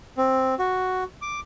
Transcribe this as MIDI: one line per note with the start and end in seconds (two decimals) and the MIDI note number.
0.17 0.55 60
0.59 1.04 66
1.22 1.40 86